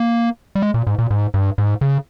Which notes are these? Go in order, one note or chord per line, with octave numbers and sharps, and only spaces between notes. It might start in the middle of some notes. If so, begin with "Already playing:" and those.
Already playing: A#3
G3
G#3
A#2
G#2
A#2
G#2
G2
G#2
C#3